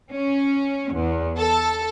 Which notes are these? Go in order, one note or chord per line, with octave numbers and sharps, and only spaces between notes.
C#4
E2
A4